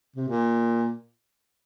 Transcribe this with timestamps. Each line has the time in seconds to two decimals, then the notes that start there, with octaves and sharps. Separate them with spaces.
0.16 C3
0.28 A#2